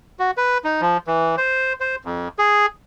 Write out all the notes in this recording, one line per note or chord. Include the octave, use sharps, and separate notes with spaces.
F#4
B4
D#4
F3
E3
C5
C5
F2
G#4